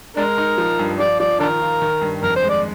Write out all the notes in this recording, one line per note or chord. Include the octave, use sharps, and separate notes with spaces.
G#3 D4 A#4
D#4
F3
G2
F3 D5
F3 D5
D#3 D4 A#4
F4
D#3
G2
F2 A#4
C5
G#3
D5